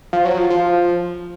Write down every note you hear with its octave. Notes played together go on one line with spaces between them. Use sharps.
F3
F#3
F3
F3